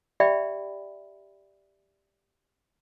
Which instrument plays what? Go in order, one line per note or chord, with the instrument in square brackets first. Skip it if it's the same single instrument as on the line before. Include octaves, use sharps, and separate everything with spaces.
[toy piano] G4 D5 E5 G5 B5